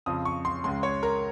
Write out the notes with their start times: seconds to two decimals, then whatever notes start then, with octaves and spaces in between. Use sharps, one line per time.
0.06 F2 C#3 F3 D#6
0.25 C#6
0.45 C6
0.64 C#2 C#3 G#3 C6
0.83 C#5
1.03 A#4